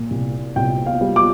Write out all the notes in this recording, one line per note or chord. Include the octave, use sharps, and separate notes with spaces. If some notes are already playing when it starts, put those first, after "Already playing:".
Already playing: A#2
C2
C2 G5
F5
G3
D6